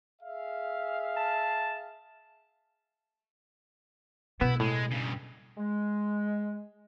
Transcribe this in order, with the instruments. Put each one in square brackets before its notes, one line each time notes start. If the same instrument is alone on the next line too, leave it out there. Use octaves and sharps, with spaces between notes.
[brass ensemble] G#4 E5 F5
[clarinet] A5
[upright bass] B2 [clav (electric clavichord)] B3 [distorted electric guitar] E4
[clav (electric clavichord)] A2 [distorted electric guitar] G#3
[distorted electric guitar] G2 C#3
[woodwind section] G#3